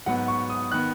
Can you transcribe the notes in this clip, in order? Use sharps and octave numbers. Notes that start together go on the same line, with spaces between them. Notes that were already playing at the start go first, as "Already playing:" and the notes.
G#2 F#3 B3 F#5
C#6
D#6
D#3 B3 F#6